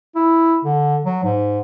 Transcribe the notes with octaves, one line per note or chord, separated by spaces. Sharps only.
E4
D3
F#3
G#2